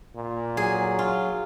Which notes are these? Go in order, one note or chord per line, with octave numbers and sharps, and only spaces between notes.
A#2
F#3 G#4
F4